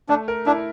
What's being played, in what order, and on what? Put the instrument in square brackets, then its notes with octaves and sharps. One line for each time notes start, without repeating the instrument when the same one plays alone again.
[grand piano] A3 [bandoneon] D4
[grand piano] A#4
[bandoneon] D4 [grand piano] E4